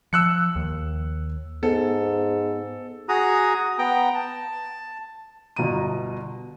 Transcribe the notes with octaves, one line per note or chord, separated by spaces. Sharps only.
F3 E6 F#6 C#7
D#2
G#2 B3 A4
F#4 G#4 A#5 D#6
B3 G5 A#5
A5
G1 B2 A#5 D#7